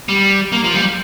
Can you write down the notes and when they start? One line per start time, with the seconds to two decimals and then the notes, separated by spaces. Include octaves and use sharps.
0.09 G3
0.52 A#3
0.64 F3
0.75 G3